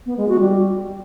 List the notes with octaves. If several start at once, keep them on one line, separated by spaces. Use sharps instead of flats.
B3
G#3
F#4
G3